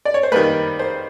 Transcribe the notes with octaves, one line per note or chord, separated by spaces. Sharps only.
D5
C#5
C5
D#3 G3 A#3 B4
C5